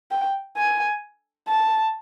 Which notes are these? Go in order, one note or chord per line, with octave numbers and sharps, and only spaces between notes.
G5
G#5
A5